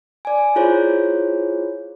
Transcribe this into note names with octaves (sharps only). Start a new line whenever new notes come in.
D5 G#5
E4 F4 G#4 C5 C#5 B5